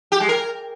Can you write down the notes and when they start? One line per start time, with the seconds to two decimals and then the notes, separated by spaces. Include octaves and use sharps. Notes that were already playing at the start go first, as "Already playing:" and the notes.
0.12 G4
0.20 G#3
0.29 A#4